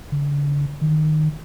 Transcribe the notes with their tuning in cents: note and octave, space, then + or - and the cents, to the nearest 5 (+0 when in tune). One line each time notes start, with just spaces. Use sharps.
D3 -40
D#3 -15